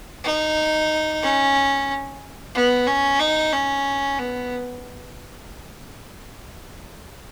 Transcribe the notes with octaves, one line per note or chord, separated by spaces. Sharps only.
D#4
C#4
B3
C#4
D#4
C#4
B3